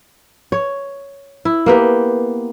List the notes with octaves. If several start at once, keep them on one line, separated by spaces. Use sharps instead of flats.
C#5
E4
A#3 B3 G4